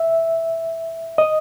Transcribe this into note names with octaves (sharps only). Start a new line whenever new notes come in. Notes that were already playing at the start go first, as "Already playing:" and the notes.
Already playing: E5
D#5